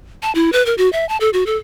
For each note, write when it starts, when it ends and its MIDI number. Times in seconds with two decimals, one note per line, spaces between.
0.23 0.32 81
0.35 0.52 64
0.52 0.65 71
0.66 0.75 70
0.78 0.91 66
0.93 1.07 76
1.09 1.17 81
1.20 1.30 69
1.33 1.44 66
1.46 1.56 69